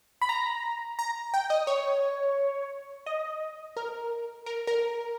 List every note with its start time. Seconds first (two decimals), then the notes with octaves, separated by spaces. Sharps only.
0.22 B5
0.29 A#5
0.99 A#5
1.34 G5
1.50 D#5
1.67 C#5
3.06 D#5
3.77 A#4
4.46 A#4
4.67 A#4